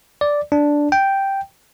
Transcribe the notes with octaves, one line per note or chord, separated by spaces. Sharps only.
D5
D4
G5